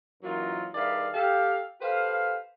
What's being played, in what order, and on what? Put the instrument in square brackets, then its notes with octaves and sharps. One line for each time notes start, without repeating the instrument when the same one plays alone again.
[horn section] F#2 E3 F#3 A#3 D#4 F4
G2 D#3 G#4 D5 E5 F5
G4 A4 F5
G4 A4 B4 C5 F5